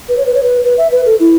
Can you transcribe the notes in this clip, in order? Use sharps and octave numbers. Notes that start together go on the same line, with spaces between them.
B4
C#5
B4
C#5
B4
B4
E5
B4
A4
E4